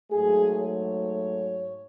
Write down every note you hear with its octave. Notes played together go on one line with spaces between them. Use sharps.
G#2 F#3 A3 G#4
C#5